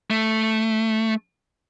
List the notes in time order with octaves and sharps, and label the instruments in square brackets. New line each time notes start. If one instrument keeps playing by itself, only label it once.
[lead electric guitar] A3